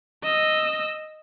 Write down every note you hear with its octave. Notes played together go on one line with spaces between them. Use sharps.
D#5 E6